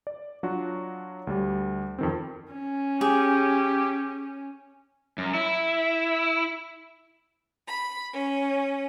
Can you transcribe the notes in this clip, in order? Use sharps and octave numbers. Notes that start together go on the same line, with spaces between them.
D5
F#3 D4 F4 F#4
D2 G3
F2 D#3 C4
C#4
G4 G#4
F#2
E4
B5
C#4